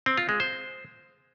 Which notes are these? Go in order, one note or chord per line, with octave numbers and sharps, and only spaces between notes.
C4
F4
G#3
C5